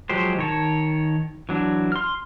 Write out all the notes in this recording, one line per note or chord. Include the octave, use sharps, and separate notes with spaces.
F3 F#3 G#3 G4 C5
D#3 C#5 A5
E3 F#3 D4
C6 F6